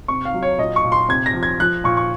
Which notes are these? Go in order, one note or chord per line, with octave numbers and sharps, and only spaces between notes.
C3 C#6
F5
F#3
C#5
A#2 D#5
C#6
A#2
C6
C3 G#6
A#6
F3
G#6
F3 F#6
A#2 C#6
C#6